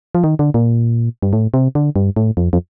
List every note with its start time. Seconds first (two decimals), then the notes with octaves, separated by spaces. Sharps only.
0.15 F3
0.24 D#3
0.39 D3
0.54 A#2
1.22 G2
1.33 A2
1.54 C3
1.75 D3
1.96 G2
2.16 A2
2.37 F2
2.53 F2